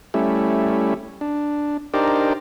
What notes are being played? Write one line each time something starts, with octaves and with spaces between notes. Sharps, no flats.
G3 A3 C#4 E4
D4
D4 D#4 G4 A#4 C5 D5